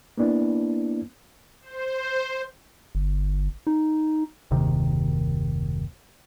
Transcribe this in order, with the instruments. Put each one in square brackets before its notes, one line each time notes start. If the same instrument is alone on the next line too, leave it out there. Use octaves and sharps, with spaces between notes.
[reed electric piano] A#3 B3 D4 E4
[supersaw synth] C5
[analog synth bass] G1
D#4
[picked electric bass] F#1 D#2 C3 D#3